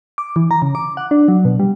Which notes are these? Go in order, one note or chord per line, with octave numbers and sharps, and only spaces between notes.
D6
E3
A#5
C#3
D6
F#5
D4
F#3
B2
G3